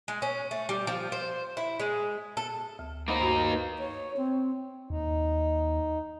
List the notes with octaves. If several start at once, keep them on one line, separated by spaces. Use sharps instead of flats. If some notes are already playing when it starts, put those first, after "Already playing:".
G#3
C#4
A3
G3
F3
C5
E4
G#3
A4
D2
A#3 D#4 C5 F#5 B5
G2 F#4
B4
C#5
C4
D#2 D#4